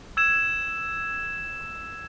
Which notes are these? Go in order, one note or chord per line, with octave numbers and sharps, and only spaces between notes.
E6 G#6 E7